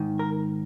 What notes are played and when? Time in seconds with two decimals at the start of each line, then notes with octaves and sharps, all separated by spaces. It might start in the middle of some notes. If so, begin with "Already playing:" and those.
Already playing: G#2 D#3
0.19 A#4